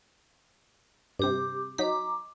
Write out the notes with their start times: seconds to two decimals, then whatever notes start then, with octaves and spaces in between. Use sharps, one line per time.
1.19 G2 C3 G4 D6
1.78 F#3 D#4 A#5 D6 B6